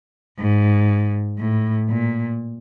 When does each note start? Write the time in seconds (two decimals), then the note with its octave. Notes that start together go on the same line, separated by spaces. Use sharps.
0.38 G#2
1.38 A2
1.89 A#2